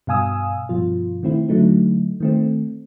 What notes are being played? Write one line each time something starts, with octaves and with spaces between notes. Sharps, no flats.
G2 B2 F5 G#5 D#6 E6
G2 B2 F3 F4
D#3 A3 C4 E4
D3 F#3 A3 D#4
D#3 A3 C4